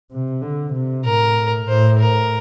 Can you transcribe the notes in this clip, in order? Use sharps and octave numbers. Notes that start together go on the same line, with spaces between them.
C3
D3
C3
A2 A#4
A2 C5
A#4